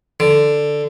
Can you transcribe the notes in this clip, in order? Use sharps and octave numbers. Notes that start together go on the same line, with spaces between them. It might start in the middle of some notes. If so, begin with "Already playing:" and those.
D3